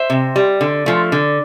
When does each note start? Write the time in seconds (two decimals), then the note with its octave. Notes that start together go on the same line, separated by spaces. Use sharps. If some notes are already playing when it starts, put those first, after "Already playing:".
Already playing: C5 E5
0.10 C3
0.36 G3
0.61 D3
0.86 F3 A3
1.12 D3